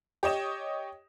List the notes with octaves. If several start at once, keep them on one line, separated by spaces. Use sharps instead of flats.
G4 C#5 D#5 E7